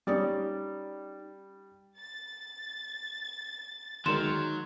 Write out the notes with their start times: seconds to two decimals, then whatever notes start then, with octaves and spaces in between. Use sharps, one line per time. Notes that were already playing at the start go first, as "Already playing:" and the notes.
0.07 G3 C#4 D#4 D5
1.99 A6
4.06 D#3 F#3 G#3 A#4 C6 E7